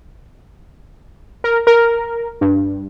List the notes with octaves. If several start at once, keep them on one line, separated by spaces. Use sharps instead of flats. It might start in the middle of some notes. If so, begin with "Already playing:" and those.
A#4
A#4
G2